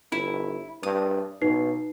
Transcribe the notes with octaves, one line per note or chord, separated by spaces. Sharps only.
G1 E4
G2 D#6
B2 D#4 B4 C7